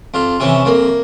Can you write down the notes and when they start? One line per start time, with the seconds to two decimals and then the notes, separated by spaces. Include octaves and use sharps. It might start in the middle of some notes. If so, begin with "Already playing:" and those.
0.14 F2 F4
0.40 C3 E3 C#4
0.65 F2 A#3